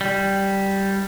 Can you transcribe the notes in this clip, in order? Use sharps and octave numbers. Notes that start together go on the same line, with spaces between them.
G3